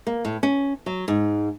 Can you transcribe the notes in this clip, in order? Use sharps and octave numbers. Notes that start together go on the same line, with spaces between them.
A#3
A2
C#4
F#3
G#2